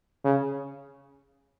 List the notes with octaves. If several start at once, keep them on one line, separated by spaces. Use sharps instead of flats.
C#3